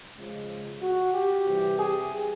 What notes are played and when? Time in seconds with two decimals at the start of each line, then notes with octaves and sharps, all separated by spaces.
0.17 C#3 F3 G#3
0.82 F#4
1.14 G4
1.46 C3 E3 G3
1.78 G#4